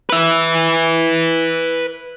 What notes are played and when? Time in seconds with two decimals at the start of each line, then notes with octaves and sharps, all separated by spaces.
0.10 B4 E5